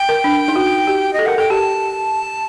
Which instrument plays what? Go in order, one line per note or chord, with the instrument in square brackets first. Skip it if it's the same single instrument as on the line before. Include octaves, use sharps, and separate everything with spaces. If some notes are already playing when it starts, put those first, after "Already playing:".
Already playing: [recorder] G5
[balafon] A#4
D4
D#4
F#4
G4
[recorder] D#5
[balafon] A4
[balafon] A#4 [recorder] F#5
[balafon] A4 [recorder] G5
[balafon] G4 [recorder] A5